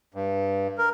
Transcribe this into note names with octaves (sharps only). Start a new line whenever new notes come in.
G2
A#4